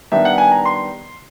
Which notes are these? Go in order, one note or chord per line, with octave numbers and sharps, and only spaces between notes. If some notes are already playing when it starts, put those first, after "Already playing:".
D#3 G3 B3 D4 E5
F#5
G#5
A#5
C6